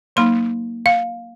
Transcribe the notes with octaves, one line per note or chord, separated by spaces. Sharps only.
F#3 A#3 D#4 C6
F5